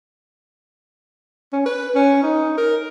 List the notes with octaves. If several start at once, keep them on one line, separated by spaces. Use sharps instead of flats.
C#4
B4
C#4
D#4
A#4